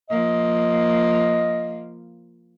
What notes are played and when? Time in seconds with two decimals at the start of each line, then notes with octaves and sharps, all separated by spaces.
0.10 F3 A#3 D#5